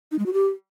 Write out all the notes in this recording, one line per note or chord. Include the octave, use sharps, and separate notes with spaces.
D#4
G#3
F#4
G4